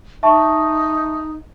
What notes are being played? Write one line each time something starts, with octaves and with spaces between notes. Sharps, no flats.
D#4 E5 A5 C#6